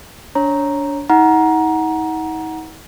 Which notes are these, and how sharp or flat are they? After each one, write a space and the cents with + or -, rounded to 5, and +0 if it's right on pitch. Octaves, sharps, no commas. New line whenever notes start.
D4 -30 C#5 -15 A#5 +0
D#4 +40 F#5 +0 A#5 +20